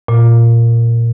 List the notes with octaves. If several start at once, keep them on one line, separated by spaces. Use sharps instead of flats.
A#2